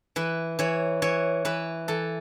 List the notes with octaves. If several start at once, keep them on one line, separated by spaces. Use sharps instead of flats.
E3 B4
E3 C#5
E3 C#5
E3 B4
E3 A4